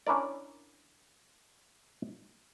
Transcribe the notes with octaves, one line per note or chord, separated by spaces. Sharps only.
C#4 D4 E4 A#4 D5